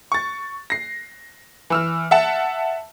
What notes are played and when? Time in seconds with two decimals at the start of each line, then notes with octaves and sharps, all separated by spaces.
0.12 C#6 A6
0.70 A#6 C7
1.70 E3 E6 F6
2.11 E5 F#5 A5